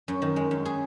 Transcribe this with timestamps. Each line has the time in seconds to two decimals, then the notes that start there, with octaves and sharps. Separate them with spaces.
0.08 F#2
0.22 D#3
0.36 G#3
0.51 F#2
0.65 G#4